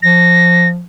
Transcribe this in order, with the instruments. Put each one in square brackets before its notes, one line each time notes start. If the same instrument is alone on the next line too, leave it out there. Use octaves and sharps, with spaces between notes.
[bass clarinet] F3 [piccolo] A#6